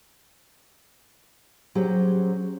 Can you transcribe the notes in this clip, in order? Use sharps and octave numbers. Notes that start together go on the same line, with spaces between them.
F#3 C#4 G4 G#4 C5